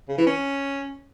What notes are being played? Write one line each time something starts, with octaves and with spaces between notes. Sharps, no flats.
C#3
E3
C#4